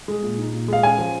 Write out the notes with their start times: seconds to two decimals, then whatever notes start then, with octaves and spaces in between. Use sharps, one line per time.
0.08 G#3
0.23 A#2
0.38 D#4
0.53 A#2
0.68 G#3 F5
0.83 C#4 G#5
0.98 F3